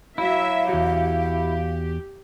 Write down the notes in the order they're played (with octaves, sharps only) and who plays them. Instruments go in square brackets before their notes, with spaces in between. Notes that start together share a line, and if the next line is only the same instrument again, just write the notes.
[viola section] F#3 E5 [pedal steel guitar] E4 [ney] F5
[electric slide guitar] E2 F#4 [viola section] G4